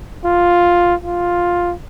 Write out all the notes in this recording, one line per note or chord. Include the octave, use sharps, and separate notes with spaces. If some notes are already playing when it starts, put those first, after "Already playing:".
F4
F4